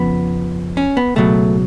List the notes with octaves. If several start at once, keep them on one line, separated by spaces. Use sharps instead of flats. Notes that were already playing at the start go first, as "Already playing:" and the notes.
Already playing: F2 C#3 F3 B3
C#4
B3
C#2 B2 F#3 A3